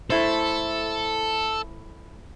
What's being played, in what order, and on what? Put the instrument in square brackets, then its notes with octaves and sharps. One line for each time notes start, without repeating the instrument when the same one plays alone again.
[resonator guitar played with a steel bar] A3 E4 C5 [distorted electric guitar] A4